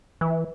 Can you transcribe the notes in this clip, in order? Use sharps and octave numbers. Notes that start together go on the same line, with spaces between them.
E3